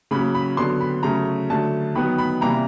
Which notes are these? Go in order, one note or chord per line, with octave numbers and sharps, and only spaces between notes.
C#3 F#3 A#3 B5
B5
D3 F#3 B3 C6
B5
C#3 F#3 A3 A#5
D3 F#3 A3 A5
D#3 F#3 B3 B5
B5
C3 E3 G3 A#3 A#5